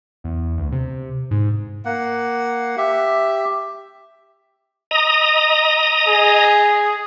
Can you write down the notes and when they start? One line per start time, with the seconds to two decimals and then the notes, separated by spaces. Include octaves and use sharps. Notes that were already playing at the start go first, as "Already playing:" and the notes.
0.24 E2
0.58 D2
0.72 C3
1.31 G#2
1.85 A#3 F#5
2.78 G4 E5
4.91 D#5 A#5 D#6
6.08 G#4